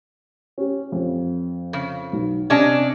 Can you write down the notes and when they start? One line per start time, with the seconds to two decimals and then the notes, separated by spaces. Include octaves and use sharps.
0.58 C#4 G4
0.92 F2
1.73 C#3
2.13 B1
2.50 C3 C#4 D4 D#5